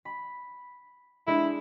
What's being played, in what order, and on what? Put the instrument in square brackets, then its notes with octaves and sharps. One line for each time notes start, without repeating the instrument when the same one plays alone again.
[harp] B5
[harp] G#3 D4 [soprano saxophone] E4